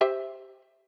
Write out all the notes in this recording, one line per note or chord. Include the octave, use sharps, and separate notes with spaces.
G4 C5 E5